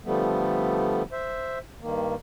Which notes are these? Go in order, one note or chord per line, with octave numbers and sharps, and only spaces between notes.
D3 F3 G3 A3 B3
C5 E5
G2 D#3 A#3